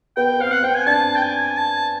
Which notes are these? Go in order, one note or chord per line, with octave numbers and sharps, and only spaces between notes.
B3 G5
C4 F5
F#5
C4 G5
G#5
D4 A5
G5
G#5
A5